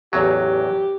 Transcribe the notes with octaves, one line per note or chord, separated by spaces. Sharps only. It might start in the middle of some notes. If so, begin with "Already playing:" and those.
A1 E2 F#3 G4